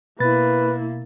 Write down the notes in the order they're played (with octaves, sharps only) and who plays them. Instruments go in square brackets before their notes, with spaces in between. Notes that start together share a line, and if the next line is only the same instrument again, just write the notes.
[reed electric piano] B2 A6 [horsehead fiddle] A#3 E4 [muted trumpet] B4